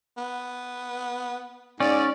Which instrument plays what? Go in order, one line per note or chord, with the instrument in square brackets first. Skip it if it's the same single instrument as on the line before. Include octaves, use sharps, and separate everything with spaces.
[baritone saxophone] B3
[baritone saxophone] G#2 [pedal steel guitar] C#4 [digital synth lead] D5